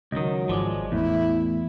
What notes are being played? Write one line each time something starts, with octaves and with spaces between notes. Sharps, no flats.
C#2 D#3 F#3 D#5 D#6
G#1 F3 G#3 D5 D6
E2 A2 A3 E4